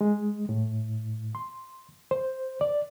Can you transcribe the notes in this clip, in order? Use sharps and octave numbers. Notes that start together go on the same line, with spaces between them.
G#3
A2
C6
C5
D5